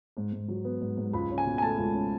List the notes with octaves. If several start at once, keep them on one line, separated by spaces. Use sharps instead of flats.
G#2
G#2
F#3
B3
G#2
G#2
C#2 B5
C#4
G#5
B2
G#5
A3 A5
C#2
C#4